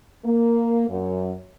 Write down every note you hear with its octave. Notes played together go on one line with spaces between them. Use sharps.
A#3
F#2